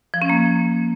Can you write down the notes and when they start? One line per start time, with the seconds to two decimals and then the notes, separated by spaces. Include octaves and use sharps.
0.14 F3
0.22 C#4
0.29 A#3